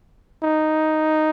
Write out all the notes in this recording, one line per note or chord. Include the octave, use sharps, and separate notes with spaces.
D#4